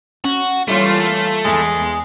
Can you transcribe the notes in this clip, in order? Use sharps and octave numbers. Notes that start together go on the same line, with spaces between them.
C#4 F#4
E3 G3 A3 A#3 F4 C#5
E2 G#3